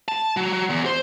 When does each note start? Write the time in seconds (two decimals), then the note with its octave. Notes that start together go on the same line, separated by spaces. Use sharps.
0.08 A5
0.37 F#3
0.53 F#3
0.70 E2
0.86 C5